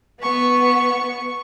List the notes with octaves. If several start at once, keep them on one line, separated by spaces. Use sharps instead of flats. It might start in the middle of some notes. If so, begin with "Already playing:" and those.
B3 C#6